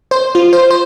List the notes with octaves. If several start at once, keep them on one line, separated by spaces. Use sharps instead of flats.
C5
F4
C5
C5